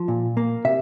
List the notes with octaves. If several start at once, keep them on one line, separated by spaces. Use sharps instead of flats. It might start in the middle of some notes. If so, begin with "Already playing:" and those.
Already playing: F3
A#2
A#3
C3 E5